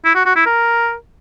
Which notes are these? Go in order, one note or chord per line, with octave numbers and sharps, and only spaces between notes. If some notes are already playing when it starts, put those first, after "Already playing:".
E4
F#4
F#4
E4
A#4